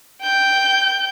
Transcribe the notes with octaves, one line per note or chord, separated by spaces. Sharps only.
G5 G6